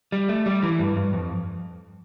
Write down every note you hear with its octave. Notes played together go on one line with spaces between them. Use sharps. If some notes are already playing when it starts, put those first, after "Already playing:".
G3
A3
G3
E3
G2
G2
F2